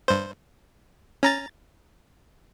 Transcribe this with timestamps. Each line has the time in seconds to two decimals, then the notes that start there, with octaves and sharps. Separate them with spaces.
0.08 G2 C5
1.23 C#4 A#5 A6